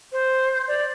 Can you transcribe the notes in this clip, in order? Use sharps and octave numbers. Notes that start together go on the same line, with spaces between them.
C5
D5